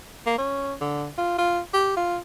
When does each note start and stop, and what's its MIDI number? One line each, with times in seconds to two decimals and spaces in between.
0.26 0.36 58
0.38 0.74 61
0.81 1.08 50
1.18 1.36 65
1.38 1.60 65
1.74 1.94 67
1.97 2.17 65